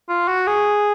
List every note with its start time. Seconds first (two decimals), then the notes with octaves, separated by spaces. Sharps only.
0.09 F4
0.28 F#4
0.47 G#4